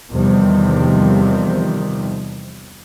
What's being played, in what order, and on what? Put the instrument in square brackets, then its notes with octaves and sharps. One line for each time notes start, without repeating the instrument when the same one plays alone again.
[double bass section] E2 C3 D#3 F3 G3 C4